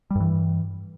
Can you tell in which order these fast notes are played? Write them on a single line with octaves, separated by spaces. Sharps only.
G3 G2 E3